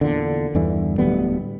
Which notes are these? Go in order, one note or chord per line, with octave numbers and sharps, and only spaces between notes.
E2 A#2 D3
E2 G2 D3 E3
D1 D2 G3 B3